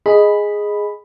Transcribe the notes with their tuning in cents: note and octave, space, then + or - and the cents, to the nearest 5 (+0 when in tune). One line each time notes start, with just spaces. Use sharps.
G#4 +0 D#5 +0 B5 +0